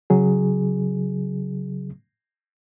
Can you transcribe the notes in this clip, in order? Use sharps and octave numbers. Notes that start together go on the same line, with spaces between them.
C#3 F#3 G#4